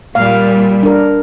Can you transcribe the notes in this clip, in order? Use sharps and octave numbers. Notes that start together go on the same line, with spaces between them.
A#2 G3 F5
D4 A#4